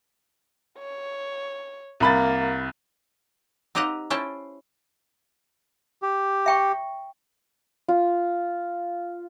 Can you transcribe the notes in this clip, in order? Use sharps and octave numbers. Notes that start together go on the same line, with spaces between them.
C#5
C2 A#3 B5 A6
C4 D#4 G4 D#5 F5 F#5
C#4 E4 C5 G5 A5
G4
E5 G5 C#6
F4